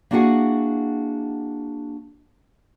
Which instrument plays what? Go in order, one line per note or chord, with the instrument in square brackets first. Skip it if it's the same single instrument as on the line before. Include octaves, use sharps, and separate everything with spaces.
[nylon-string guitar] A#3 D4 E4 F#4 G#4 F#5